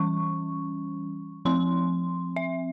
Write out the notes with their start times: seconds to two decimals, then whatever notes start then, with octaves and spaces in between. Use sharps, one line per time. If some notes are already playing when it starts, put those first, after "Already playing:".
Already playing: E3 G3 C#4 C#6
1.45 F3 C4 C6
2.36 E5